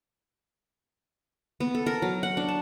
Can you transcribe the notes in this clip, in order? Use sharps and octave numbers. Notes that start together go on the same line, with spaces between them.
B3
A4
A#4
F#3
F#5
D4
A5